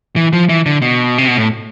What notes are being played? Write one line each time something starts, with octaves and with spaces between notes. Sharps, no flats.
E3
F3
E3
D3
B2
C3
B2
A2